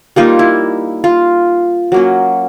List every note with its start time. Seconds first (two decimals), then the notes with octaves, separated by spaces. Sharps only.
0.16 G3 A#3 D#4 F4
0.39 E4
1.04 F4
1.92 F#3 A#3 C#4